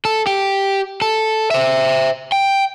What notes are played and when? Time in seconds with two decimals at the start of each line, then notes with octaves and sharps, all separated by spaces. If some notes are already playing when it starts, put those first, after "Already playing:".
0.05 A4
0.27 G4
1.02 A4
1.51 C5 E5
2.32 G5